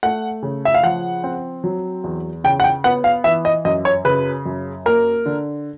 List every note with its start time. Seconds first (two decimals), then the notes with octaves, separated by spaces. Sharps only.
0.03 A3 F#5
0.43 C#3
0.65 E5
0.74 F5
0.83 F3 F#5
1.24 C4
1.64 F#3
2.04 E2
2.44 C#3 G5
2.60 F#5
2.64 G5
2.84 B3 F#5
3.04 F5
3.24 E3 E5
3.45 D#5
3.65 F#2 D#5
3.85 C#5
4.05 C#3 B4
4.45 F#2
4.86 A#3 A#4
5.26 D3